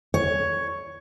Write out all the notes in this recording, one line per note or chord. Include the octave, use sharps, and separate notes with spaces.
C#5